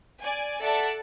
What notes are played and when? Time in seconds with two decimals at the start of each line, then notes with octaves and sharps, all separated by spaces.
0.23 D5 G#5
0.62 A4 D5 E5 F#5 A5